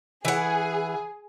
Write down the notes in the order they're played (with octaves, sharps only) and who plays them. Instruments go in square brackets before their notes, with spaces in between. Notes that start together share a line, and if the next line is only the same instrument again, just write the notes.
[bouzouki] E3 F#5 [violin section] G#4